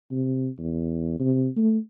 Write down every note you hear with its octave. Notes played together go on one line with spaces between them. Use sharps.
C3
E2
C3
A3